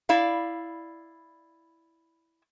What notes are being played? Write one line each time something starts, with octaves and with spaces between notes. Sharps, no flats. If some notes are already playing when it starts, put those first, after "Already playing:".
E4 D5 F5